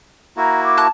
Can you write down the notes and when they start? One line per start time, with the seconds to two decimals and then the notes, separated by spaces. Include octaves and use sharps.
0.37 A#3 E4 F#4 A#5
0.64 D6
0.77 A5 F#6